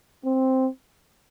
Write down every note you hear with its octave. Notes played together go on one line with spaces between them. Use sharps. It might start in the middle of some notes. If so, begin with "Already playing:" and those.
C4